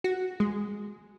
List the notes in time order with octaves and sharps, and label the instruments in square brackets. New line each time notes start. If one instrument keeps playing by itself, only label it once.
[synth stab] F#4
G#3